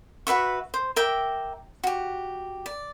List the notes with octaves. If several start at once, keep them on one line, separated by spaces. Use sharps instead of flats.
F#4 B4 E5 C#6
C5
A#4 E5 G5 D6
F#4 G4
D5